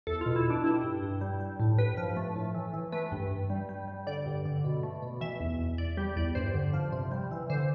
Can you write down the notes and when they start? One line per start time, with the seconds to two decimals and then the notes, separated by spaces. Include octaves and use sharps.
0.07 E2 A4
0.21 F4
0.26 B2
0.36 E4
0.45 B2 D4
0.64 G2 E4
0.83 G2
1.02 G2
1.21 G3
1.40 G3
1.60 A2
1.78 G2 B4
1.97 F3
2.17 A3
2.36 A2
2.55 E3
2.74 E3
2.92 A3 B4
3.12 G2
3.31 G2
3.50 G3
3.69 G3
3.88 G3
4.07 D3 D5
4.26 G2
4.45 D3
4.64 B2
4.83 A3
5.02 B2
5.21 E3 E5
5.40 E2
5.59 E2
5.78 E2 D5
5.97 G3 G4
6.16 E2 D5
6.35 G2 C5
6.54 D3
6.73 F3
6.92 C3
7.11 G3
7.31 E3
7.50 D3 C5